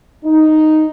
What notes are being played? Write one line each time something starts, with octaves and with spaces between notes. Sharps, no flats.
D#4